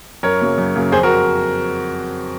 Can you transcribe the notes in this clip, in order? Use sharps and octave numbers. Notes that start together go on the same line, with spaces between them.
F#2 A#4 C#5
C#3 F#3 A#3
F#2
C#3 F#3 A#3
F2 G#4 C5
F#4 A#4